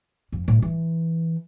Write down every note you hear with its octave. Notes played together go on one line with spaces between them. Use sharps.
F2
A2
E3